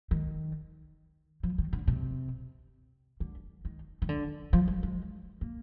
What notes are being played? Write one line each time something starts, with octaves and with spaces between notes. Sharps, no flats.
D#3
F3
D#3
D3
C3
D3
D#3
D#3
D3
F3
G3
G#3
A#3